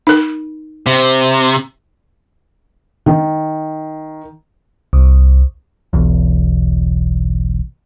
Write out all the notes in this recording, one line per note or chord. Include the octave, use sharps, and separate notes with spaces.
D#4 A#4
C3
D#3
C2
E1 B1 E2